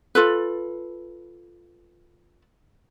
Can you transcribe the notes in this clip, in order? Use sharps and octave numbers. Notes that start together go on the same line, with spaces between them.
F4 A4 B4